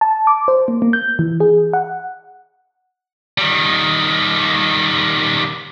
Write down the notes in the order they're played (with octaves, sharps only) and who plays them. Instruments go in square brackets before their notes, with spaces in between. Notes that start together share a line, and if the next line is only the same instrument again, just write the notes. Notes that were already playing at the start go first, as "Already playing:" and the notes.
[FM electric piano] A5
D6
C5
A#3
A#3
G6
E3
G#4
F#5
[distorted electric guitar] D#3 G3